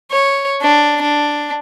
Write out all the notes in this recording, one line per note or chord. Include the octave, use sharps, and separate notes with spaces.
C#5
D4
D4